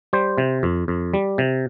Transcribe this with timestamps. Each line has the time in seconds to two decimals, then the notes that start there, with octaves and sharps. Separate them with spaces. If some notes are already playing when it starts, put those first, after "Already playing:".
0.13 G3 C5
0.38 C3
0.63 F2
0.88 F2
1.14 G3
1.38 C3